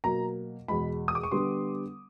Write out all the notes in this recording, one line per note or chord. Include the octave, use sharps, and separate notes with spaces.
B2 F#3 A#3 A#5
E2 B2 G#3 B5
D#6
D6
C#6
D3 G3 B3 C6